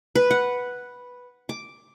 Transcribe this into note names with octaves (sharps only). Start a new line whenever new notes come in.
B4
F#5
D6